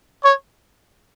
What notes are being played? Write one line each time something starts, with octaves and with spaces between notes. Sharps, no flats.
C#5